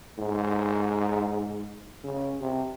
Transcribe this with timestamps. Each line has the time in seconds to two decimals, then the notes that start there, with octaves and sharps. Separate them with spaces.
0.18 G#2
2.04 C#3
2.41 C3